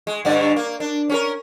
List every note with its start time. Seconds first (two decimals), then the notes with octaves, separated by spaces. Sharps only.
0.07 G#3
0.25 G2 D3 D5
0.56 A#3
0.80 D4
1.10 C#4 G#4 A#4